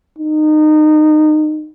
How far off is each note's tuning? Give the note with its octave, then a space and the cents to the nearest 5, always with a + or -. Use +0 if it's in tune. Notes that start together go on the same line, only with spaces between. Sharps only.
D#4 -25